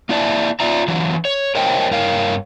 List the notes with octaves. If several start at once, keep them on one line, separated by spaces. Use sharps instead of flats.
A#3 E4 D5 E5 A5
F4 D5 E5 A#5
D3 E3 F#3
C#5
A#4 C5 C#5 D#5 G5
G2 A#4 C#5 F5